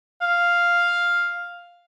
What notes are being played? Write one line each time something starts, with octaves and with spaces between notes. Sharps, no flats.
F5